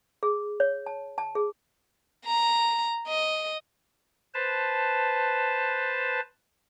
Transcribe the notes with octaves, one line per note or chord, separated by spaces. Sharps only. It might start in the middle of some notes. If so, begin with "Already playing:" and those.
G#4
C#5
A5
A5
G#4
A#5
D#5
B4 C5 A5